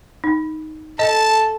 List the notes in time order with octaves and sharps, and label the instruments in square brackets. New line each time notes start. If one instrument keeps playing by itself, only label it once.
[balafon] D#4
[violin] A4 [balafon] D#5 [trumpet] A5